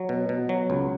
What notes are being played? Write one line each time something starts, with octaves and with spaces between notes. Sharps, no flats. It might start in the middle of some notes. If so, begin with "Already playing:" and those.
Already playing: F#3
B2
B2
F#3
C#2